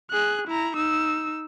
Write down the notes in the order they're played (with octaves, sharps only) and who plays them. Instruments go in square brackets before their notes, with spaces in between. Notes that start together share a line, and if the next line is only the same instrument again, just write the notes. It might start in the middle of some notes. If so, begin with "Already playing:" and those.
[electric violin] G#4 F#6
E4 A#5
D#4 E6